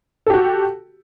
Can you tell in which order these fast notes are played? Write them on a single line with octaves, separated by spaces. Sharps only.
A4 G4 F#4